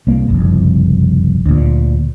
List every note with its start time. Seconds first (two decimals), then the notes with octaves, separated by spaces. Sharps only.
0.07 C2 A#3
0.28 F#1 C2 F2
1.46 D2 A#2